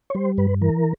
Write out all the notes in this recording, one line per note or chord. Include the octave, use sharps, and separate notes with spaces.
C#5
G3 C5
G2 B4
E3 A#4